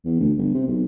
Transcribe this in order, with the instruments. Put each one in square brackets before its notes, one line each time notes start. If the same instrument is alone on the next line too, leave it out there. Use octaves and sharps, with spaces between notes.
[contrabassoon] E2
D2
G1
C3
B1